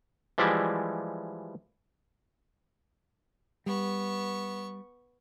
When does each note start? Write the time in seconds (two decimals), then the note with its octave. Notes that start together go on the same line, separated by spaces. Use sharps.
0.38 E3 F3 G3 G#3 D5 E5
3.66 G3 B3 C#6